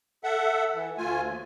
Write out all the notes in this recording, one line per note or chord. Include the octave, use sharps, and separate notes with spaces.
A4 E5 F#5
E3
D2 A3 F4 G#5
D#2